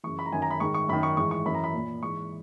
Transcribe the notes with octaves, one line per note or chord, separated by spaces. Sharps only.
F#2 C#3 E3 C#6
B5
A#5
F#2 D#3 G#5
A#5
B5
G#2 D#3 C#6
C#6
F#2 D#3 B5
C#6
G#2 E3 C#6
C#6
F#2 E3 B5
A#5
B5
A#2
G#2 E3 C#6